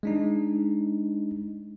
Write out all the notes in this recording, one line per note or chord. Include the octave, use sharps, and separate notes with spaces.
G#3 D4 D#4